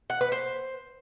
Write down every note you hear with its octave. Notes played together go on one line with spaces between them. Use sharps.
F#5
B4
C5